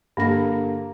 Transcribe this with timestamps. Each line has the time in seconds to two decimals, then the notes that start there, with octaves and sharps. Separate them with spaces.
0.17 G2 D3 A#3 A#6